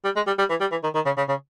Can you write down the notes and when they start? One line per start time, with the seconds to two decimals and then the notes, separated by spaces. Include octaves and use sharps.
0.04 G3
0.16 G#3
0.27 G3
0.38 G3
0.50 E3
0.60 G3
0.71 E3
0.83 D#3
0.95 D#3
1.05 C#3
1.17 C#3
1.29 C#3